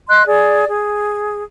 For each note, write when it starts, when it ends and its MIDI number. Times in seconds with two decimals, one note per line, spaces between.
0.08 0.23 75
0.08 0.23 84
0.08 0.23 90
0.27 0.66 68
0.27 0.66 74
0.68 1.44 68